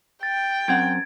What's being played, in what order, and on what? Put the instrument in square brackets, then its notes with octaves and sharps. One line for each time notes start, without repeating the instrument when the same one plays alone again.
[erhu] G5 [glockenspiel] A6
[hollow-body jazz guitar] F#2 C4 F#5 [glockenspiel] G#6 D7